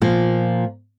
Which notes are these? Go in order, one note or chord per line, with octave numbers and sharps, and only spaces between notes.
A#2 F3 A#3